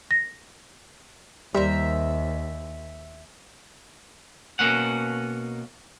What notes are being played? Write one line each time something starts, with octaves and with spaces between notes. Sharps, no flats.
A#6
D#2 G3 A#4 C5 E5
B2 A#3 C#4 F#5